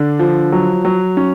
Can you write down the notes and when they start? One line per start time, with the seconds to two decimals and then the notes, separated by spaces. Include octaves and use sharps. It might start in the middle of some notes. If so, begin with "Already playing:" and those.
Already playing: D3 D4
0.19 F3
0.52 F#3
0.85 F#3
1.17 C#4